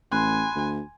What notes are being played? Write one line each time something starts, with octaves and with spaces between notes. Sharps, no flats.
A1 G#5 B5 C6 F#6
D2